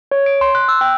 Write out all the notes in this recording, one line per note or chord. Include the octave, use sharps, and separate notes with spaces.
C#5
D7
C6
F#6
E6
G5